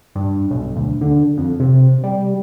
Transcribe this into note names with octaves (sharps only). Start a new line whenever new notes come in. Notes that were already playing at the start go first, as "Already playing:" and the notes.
G2
B1
D2
D3
F2
C3
G3